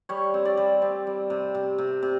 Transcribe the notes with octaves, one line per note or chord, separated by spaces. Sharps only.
G3 C#5
C4
D5
G3
C4
G3
C3
C3
C3
C3